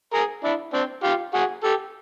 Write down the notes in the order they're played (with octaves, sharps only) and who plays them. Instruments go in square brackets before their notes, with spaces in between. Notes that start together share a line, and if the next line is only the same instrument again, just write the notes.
[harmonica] G#4 A#4
D4 E4
C4 D4
F4 G4
F#4 G#4
G4 A4